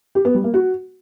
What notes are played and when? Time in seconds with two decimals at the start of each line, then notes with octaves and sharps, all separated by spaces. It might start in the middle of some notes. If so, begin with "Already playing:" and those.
0.15 G4
0.25 B3
0.34 G3
0.44 A#3
0.54 F#4